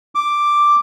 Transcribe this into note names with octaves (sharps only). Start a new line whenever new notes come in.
D6